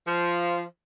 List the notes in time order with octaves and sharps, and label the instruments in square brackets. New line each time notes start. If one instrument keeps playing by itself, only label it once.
[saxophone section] F3